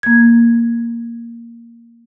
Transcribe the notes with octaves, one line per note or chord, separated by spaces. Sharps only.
A#3 G#6